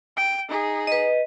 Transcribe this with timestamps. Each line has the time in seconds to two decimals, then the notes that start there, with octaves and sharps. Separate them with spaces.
0.17 G5
0.49 D#4 G#4
0.87 B4 D#5